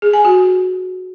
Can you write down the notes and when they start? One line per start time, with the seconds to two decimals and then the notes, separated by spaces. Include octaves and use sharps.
0.02 G#4
0.13 G#5
0.25 F#4